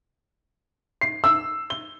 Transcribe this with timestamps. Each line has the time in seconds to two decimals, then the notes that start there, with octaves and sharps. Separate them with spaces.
1.01 C7
1.24 E6
1.70 G7